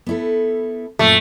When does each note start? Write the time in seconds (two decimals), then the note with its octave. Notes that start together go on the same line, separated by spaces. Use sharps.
0.06 B3 E4 A4
0.99 F#2 A#2 A3